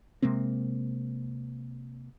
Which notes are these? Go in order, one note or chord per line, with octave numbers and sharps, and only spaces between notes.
C3 G#3 A#3 C4